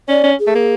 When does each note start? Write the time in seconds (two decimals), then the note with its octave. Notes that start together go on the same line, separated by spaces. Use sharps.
0.09 C#4 D5
0.24 C#4
0.39 G#4
0.47 A3
0.55 A#3